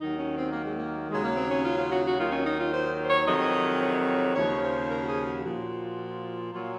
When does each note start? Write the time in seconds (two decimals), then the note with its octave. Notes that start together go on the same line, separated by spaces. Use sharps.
0.01 D#2 D#3 F#3 D#4
0.19 C#4
0.37 C4
0.51 A#3
0.64 G#3
0.77 A#3
1.10 D#2 C#3 F#3 G#3
1.24 A#3
1.36 C4
1.51 C#4
1.64 F4
1.78 F4
1.91 F#4
2.05 F#4
2.19 D#2 D#3 F#3 F4
2.32 C#4
2.46 D#4
2.59 F4
2.73 C5
3.05 C5
3.09 C#5
3.27 F2 C3 D#3 F#3 D#5
3.81 C#5
4.35 D#2 C#3 F3 C#5
4.63 C5
4.90 A#4
5.02 F#4
5.08 G#4
5.26 F#4
5.44 A#2 F3
6.53 A#2 F#3 F4